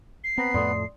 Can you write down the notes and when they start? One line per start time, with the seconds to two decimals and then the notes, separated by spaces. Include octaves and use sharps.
0.24 C7
0.38 B3 C4 A#5 A#6 B6
0.54 F2 A2 A3 D5 C6 D#6